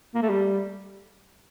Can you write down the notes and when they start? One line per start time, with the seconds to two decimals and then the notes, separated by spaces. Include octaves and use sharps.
0.15 A#3
0.22 A3
0.30 G3